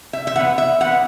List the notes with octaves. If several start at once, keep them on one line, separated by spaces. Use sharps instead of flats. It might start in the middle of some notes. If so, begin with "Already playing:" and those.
E5
E5
E3 B3 F#5
E5
E3 B3 F#5